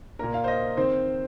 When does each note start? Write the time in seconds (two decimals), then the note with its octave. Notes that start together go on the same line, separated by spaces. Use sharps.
0.19 A#2 A#3 A#4
0.34 F5
0.44 C5
0.48 D#5
0.77 D#3 C4 C5